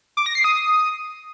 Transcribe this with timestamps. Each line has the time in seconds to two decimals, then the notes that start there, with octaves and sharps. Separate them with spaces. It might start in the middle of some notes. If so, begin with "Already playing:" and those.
0.17 D6
0.26 A#6
0.35 C7
0.44 D#6